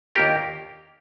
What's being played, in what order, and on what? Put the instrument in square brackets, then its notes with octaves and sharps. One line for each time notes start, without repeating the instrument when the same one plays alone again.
[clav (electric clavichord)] D#2 D#3 A#3 D4 F4 G4 A#4